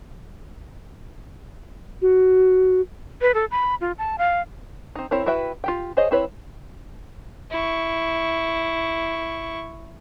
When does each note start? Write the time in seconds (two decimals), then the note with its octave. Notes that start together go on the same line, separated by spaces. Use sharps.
2.02 F#4
3.21 B4
3.35 A4
3.51 B5
3.81 F4
3.98 A5
4.18 F5
4.95 C4 D#4
5.11 C4 E4 A#4 C#5
5.26 E4 F#4 B4 E5 G5
5.64 F4 G4 G5
5.97 G#4 C5 C#5 D#5
6.11 C4 E4 B4 C#5
7.51 E4 C#6